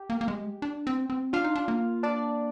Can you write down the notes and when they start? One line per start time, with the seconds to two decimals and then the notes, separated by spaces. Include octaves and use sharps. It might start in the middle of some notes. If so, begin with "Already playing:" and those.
Already playing: G4
0.10 A#3
0.21 A#3
0.28 G#3
0.62 D4
0.87 C4
1.10 C4
1.33 D4 F4 F5
1.44 D#4
1.56 D4
1.68 A#3
2.03 D4 D5